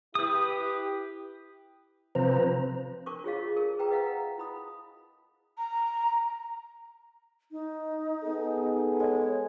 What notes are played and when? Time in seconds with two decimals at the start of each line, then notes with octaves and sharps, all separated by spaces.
0.15 E4 G4 B4 D#6
2.15 C3 F3 B4 C5 A#5
3.06 D4 A#4 C#6 D6
3.24 F4 G4 G#4 C#5 D#5 F5
3.56 G#4 A#4
3.79 B4 G5 A#5
3.91 B4 D#5 F5 F#5 A#5
4.38 E4 B5 D#6
5.57 A#5
7.51 D#4
8.24 B3 G#4 A4
9.00 G#3 C#5